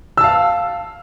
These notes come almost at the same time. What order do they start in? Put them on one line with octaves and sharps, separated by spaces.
E6 A5 F5